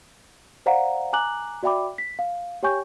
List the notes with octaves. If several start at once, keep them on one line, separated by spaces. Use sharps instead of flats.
C5 D5 F5 F#5 A#5
G#5 A#5 D6 F#6 F#7
F#4 D5 E5 G5 B5 D6
B6
F5
G4 C#5 G5 G#5 C#6 G6